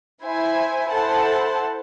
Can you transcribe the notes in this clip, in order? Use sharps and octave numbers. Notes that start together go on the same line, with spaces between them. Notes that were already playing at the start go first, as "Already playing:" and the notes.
E4 C5 E5 G#5
E4 A4 C5 F#5 A5